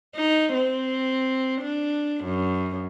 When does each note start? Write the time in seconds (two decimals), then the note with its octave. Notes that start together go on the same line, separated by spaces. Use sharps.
0.16 D#4
0.54 C4
1.61 D4
2.24 F#2